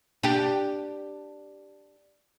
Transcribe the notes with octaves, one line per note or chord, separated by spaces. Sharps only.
D4 G4